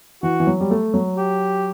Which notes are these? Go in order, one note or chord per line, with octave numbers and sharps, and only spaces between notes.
E3 F#4
E3
F#3
G3
A3
F#3
G4